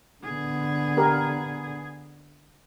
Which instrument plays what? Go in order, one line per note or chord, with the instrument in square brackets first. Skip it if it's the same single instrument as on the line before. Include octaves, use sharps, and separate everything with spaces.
[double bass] D3 B3 [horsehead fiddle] G#4
[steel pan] G4 A#4